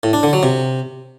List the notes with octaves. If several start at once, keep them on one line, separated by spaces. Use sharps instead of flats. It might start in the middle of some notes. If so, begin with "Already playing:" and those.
A2
D4
D3
F#3
C3